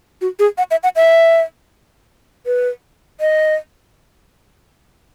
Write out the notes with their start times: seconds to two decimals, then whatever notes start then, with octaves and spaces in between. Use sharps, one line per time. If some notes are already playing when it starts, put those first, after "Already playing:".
0.21 F#4
0.39 G#4
0.58 F#5
0.71 E5
0.83 F#5
0.96 E5
2.46 B4
3.20 D#5